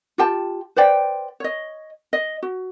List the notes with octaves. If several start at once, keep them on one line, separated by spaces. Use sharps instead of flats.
F4 G4 G5 A5
B4 C5 D5 G5
C#5 D#5
D#5
F#4